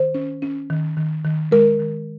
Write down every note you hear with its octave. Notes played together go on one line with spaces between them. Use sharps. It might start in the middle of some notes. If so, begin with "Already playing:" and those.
Already playing: D#3 C5
C#4
C#4
D#3
D#3
D#3
G#3 A#4
D#3